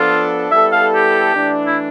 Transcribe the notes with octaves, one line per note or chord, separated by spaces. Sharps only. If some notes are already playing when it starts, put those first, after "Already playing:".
Already playing: F3 B3 D4 F4 A4
G3 B3 E4 A4 E5
F5
G4
E3 A3 D4
E4